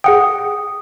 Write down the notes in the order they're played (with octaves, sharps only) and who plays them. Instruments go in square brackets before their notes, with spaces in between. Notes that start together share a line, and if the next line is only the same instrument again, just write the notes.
[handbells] G#4 F#5 G5 [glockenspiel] D#6